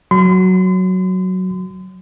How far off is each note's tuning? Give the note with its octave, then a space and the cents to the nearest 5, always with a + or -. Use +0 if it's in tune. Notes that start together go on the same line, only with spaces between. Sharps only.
F#3 +0 C6 -40